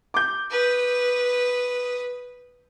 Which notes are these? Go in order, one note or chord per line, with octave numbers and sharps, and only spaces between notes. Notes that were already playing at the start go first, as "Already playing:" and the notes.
D6 G6
B4 D#6